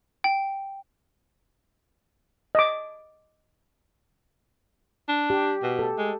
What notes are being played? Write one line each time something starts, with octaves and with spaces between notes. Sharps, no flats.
G5
D#5 D6
D4
G4
B2
A4
G#3